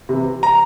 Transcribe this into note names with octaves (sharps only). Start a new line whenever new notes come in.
C3 E3
A#5